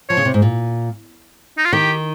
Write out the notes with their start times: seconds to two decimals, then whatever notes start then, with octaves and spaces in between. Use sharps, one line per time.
0.09 F3 C#5
0.17 C#3
0.25 C3
0.34 G#2
0.42 A#2
1.58 D#4
1.65 F4
1.73 D#3 G4